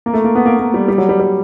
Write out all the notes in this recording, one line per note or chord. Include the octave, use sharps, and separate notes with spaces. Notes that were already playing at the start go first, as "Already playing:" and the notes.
A#3
A3
A#3
B3
A#3
A#3
G3
G3
F#3
G3
G3